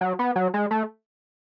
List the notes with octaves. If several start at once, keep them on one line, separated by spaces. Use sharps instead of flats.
F#3
B3
F#3
G#3
A3